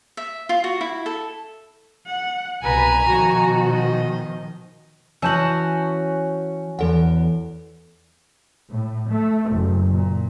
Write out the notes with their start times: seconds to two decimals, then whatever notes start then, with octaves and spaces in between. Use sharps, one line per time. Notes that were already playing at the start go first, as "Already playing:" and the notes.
0.17 E5
0.49 F4
0.64 F#4
0.81 E4
1.06 A4
2.06 F#5
2.63 C2 B2 B4 G#5 A#5
3.06 B2 D#3 F3 F#4
3.69 D#5
5.22 E3 C#4 F#4 A5 E6 G6 F#7
6.79 E2 E3 A4 F#5
8.69 A2
9.08 A3
9.49 F#1
9.93 A#2